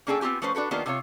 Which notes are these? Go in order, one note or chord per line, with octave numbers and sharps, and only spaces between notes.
A#3 C#4 D4 G#4 A4 G5
B3 C4 F4 G4 G#5
F3 A3 C#4 B4 C5
D4 F#4 A4 B4
D#3 A#3 B3 D4 F4 G4
C3 D4 F4 C#5